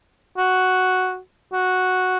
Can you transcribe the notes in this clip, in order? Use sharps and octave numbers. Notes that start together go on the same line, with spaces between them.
F#4
F#4